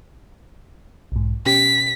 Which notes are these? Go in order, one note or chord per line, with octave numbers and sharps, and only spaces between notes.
B1 G#2
B2 C#4 G4 B6